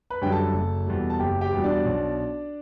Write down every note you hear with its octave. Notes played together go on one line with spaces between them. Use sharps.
B4 B5
F#2 D3 G3 G5
A4 A5
F#1
E2 B2 G3
A5
F#1 G4 G5
G4 G5
E2 B2 G3
D4 D5
B1